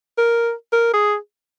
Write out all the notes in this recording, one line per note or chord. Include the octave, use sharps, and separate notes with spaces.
A#4
A#4
G#4